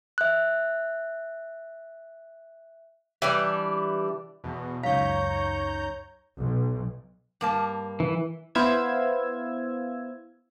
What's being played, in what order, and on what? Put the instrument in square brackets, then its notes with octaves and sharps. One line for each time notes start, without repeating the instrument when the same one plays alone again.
[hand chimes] E5 F#6
[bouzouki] E3 G3 D4
[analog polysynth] E2 B2
[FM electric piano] C#2 F#2 D#4 [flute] C#5 [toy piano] F5 [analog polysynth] A#5 G6
[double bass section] B1
[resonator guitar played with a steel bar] G2 A#3 A5
[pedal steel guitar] E3
[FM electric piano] B3 E4 C5 F5 E6 G#6